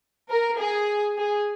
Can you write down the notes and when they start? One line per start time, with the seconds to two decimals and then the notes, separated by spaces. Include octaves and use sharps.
0.30 A#4
0.59 G#4
1.18 G#4